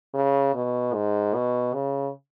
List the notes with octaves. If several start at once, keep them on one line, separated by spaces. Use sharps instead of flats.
C#3
B2
G#2
B2
C#3